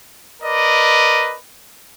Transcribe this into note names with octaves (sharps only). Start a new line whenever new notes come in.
A#4 B4 D5 D#5